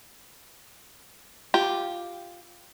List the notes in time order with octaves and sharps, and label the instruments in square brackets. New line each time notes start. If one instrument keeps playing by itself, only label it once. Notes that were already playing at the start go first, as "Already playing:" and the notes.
[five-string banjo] F4 G4